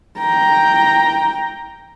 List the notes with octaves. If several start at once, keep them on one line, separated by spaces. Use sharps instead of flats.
G5 A#5